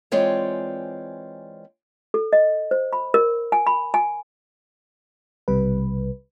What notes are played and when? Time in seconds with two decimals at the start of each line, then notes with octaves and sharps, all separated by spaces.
0.11 E3 G#3 C4 F4 C#5 D5
2.14 A4
2.33 D#5
2.71 C5
2.93 B5
3.14 A#4
3.52 G#5
3.67 B5
3.94 G#5
5.48 B1 C3 G3 B4